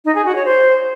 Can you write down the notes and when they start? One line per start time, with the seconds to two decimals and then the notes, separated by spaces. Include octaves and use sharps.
0.05 D#4
0.15 G#4
0.25 F#4
0.35 C#5
0.45 C5